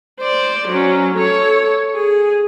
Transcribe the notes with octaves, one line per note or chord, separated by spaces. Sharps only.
C5 D5
F#3 C#4
A4 C#5
G#4